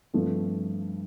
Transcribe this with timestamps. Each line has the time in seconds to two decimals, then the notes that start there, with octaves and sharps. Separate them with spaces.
0.14 G2 F3 A3 C4